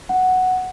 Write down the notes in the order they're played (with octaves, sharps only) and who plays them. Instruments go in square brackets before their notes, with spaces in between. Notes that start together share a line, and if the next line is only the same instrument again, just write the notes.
[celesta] F#5